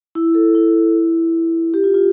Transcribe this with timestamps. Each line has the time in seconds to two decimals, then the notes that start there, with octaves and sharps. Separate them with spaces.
0.15 E4
0.35 A4
0.55 E4
1.74 G4
1.84 F4
1.94 F4